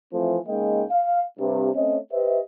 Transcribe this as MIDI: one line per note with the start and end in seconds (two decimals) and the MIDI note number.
0.13 0.37 52
0.13 0.37 53
0.13 0.37 57
0.13 0.37 60
0.47 0.83 49
0.47 0.83 56
0.47 0.83 58
0.47 0.83 63
0.47 0.83 75
0.47 0.83 79
0.91 1.22 77
1.39 1.68 43
1.39 1.68 48
1.74 1.97 57
1.74 1.97 60
1.74 1.97 61
1.74 1.97 73
1.74 1.97 75
2.11 2.38 67
2.11 2.38 71
2.11 2.38 72
2.11 2.38 75
2.11 2.38 76